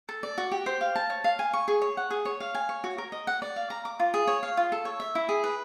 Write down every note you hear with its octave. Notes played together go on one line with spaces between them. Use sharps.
A4
D5
F#4
G4
C5
F5
A5
C#5
F5
G#5
C#6
G#4
C#5
F#5
G#4
C#5
F5
G#5
C#5
F#4
A#4
D#5
F#5
D5
F5
A#5
D6
F4
G#4
C#5
F5
F4
A4
C#5
E5
E4
G#4
B4